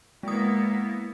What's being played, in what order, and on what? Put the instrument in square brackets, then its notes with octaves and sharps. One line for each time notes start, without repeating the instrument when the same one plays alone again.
[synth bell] G#3 D#6 [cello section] A#3 B3 E4